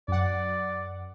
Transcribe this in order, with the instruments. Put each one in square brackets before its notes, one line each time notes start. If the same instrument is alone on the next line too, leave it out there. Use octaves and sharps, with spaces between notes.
[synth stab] F#2 F#5 [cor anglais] D5